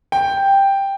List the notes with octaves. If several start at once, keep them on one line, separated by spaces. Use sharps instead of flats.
G5